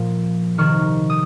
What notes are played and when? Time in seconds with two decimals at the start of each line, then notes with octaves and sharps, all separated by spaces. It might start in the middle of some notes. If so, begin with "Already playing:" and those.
Already playing: A#2 F3
0.58 C3 D#3 C#6 F6
1.10 D#6